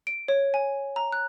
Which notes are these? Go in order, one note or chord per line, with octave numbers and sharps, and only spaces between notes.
D7
C#5
G#5
A#5
F#6